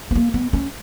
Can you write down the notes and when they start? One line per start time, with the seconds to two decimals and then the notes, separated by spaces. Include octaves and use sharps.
0.11 B3
0.15 A#3
0.34 B3
0.53 C#4